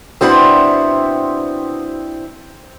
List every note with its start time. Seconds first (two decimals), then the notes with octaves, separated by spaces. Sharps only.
0.21 B2 C4 D4 E4 C5 F#5 B5